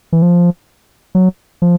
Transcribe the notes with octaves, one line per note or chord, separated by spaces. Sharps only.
E3
F3
F#3
F3